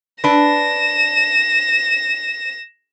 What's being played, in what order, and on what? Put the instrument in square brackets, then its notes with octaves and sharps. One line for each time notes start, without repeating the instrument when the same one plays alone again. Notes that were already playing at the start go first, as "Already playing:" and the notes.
[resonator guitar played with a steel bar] D4 B4 [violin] A#6 E7